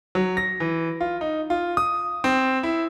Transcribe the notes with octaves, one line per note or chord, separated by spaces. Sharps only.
F#3
A#6
E3
F4
D#4
F4
D#6
C4
E4